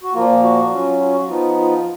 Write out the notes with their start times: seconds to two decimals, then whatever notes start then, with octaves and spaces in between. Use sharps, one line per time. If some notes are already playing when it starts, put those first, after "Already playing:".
0.03 F#4
0.14 A#2 F3 A#3 F4
0.43 F#4
0.71 F#3 C#4 F4
1.00 F4
1.12 F#4
1.25 F3 B3 D#4 F4
1.57 F4